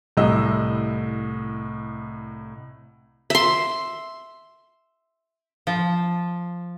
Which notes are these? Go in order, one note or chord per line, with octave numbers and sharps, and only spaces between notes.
C2 A2 D#5 E6
E5 C6
F3